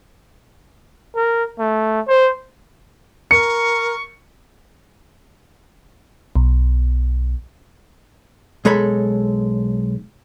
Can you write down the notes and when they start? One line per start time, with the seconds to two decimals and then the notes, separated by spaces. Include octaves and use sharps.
1.15 A#4
1.59 A3
2.08 C5
3.31 A#4 C#6 C#7
6.36 B1
8.65 B1 G#3 A4 C#5 B5